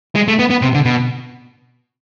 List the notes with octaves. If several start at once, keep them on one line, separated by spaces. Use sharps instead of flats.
G#3
A3
B3
B3
C3
D3
B2